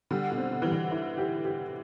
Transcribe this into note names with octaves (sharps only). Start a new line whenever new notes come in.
D3 G3
B2
C4
B2
E3 G3
D3
E4
G4
G4